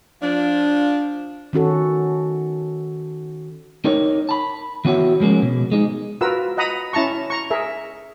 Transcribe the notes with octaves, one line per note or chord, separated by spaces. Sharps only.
F3 D4
D#3 C#4 F#4 A4
D#4 A#4 C#5 D#5
A5 B5
E3 B3 F#4 C#5 E5
F3 G#3 A#3 C#4
B2
G#3 D#4
F4 F#4 A#4 B4 E6
D#5 F#5 A#5 B5 D#6
C#4 E4 A5 A#5 C#6
A#5 C#6
G#4 A#4 E5